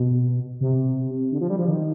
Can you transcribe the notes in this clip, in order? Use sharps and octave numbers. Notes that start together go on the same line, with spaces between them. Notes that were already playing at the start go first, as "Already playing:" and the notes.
Already playing: B2
C3
D3
F3
G3
F3
D#3